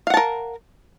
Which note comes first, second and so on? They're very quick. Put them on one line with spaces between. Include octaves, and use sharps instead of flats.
F5 F#5 A5 A#4